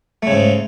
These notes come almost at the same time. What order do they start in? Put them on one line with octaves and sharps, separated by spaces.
A3 C#3 G#2